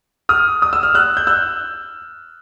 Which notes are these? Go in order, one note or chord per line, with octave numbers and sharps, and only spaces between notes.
D#6 F6
D#6
E6
F6
E6 F#6
G6
E6 F#6